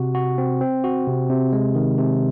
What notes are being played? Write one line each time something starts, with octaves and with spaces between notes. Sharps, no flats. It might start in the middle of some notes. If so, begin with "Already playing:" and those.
Already playing: C3 F#4
F#4
C4
C4
F#4
C3
C3
G#3
D#3
C3